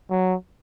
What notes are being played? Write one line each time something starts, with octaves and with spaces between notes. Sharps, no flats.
F#3